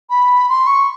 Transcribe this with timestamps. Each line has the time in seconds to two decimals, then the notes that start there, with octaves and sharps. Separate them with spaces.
0.10 B5
0.49 C6
0.67 C#6